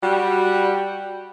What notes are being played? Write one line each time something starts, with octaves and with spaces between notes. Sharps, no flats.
G3 F#4